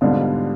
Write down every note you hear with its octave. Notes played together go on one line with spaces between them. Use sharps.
G#2 B2 D3 G3 D4 F4